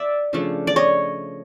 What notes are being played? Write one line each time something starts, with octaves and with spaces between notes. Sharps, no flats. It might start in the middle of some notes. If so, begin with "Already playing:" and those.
Already playing: D5 E5
C#3 F3 A3 D4
D5
C#5 D#5